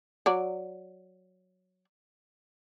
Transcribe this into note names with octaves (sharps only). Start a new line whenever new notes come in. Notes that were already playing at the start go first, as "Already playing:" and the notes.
F#3 D5